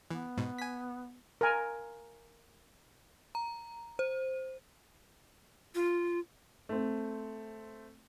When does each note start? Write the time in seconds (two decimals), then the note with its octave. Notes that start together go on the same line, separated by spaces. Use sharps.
0.11 E3 B3
0.37 G#2 B2
0.58 G#5 B6
1.41 A#4 G#5
3.35 A#5
3.99 C5
5.75 F4
6.69 A3 C4